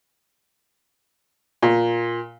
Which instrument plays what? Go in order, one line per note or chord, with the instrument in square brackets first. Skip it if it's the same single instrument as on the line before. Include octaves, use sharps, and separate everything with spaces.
[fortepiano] A#2